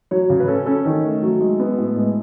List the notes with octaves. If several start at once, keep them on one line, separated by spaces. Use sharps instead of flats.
F#3 C#5
C#3
B4
C#4 A4
C#4 A4
D#3
A3
F#3
G#3
B3
A2
G#3